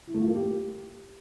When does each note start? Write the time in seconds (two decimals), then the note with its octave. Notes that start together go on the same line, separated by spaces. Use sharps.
0.07 E4
0.14 A3
0.21 F4
0.28 A#3
0.35 G4